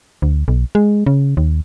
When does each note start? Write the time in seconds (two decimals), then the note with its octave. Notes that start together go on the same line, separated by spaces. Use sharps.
0.22 D2
0.48 B1
0.75 G#3
1.06 C#3
1.37 D#2